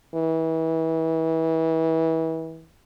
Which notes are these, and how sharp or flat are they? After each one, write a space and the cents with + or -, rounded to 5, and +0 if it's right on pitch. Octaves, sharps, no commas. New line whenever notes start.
E3 -30